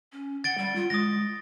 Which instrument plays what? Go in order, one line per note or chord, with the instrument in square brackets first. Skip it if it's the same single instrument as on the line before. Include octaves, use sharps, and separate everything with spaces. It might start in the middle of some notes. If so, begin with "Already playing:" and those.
[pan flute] C#4
[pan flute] F#5 [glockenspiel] A6 D7 G7
[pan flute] G3
F4
[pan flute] G#3 [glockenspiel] D#6 A#6